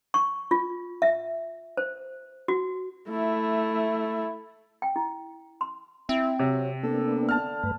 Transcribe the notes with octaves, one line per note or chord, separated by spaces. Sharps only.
C#6
F4
E5
C5
F#4
A3 E4
G5
E4
C6
C4 E4
C3 F#3
A#3 B3 D4 A4
D3 A5 F6
G2 A3 B4